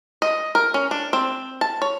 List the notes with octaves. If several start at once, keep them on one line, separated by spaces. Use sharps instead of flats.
D#5
A#4
C#4
D4
C4
A5
C#5